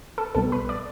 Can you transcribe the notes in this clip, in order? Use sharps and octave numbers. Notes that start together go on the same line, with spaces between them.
A4
B1 B2 G3 A4
B4
D5